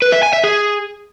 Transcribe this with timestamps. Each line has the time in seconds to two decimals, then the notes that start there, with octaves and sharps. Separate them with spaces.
0.02 B4
0.12 E5
0.23 G#5
0.33 E5
0.44 G#4